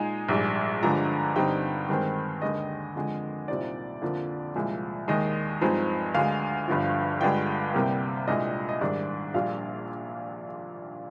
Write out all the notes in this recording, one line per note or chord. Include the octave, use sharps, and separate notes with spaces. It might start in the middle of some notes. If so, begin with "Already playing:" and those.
Already playing: A#2 G#3 D#4 G#5
A#1 G#2 G3
G2 D3 F3 G#3 A#5
G2 D3 G3 C4 D#4 G5
G2 D#3 G#3 C4
D#2 D3 G#3 D#5
F2 D3 G#3
C2 A#2 G3 C4 D#4 D5
F2 D3 F3 A#3
C2 A#2 F3 G#3
D#2 D#3 G#3 D#5
G2 F3 G#3 C4 D#4
D2 D3 G#3 F5
G1 G2 D3 F3
G2 D3 G#3 D4 F4 G5
C2 C3 G3 A#3
C2 A#2 G#3 D4 F4 D#5
D#5
G#2 D#3 G3 D4 D5
A#1 A#2 G3 D4 F4 F5